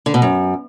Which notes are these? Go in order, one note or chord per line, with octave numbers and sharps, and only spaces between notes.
D3
B2
F#2